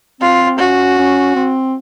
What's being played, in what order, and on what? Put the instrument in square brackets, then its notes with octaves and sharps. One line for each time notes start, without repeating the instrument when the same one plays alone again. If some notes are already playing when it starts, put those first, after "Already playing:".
[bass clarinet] C4 [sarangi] F4
[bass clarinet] C#4 [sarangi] F#4
[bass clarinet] C#4
C4